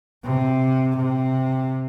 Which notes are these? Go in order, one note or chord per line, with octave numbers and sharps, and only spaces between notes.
C3
C3